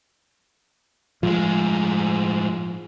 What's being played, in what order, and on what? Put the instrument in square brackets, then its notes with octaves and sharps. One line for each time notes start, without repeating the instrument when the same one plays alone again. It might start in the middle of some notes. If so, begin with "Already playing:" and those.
[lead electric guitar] A2 G#3 [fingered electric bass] F3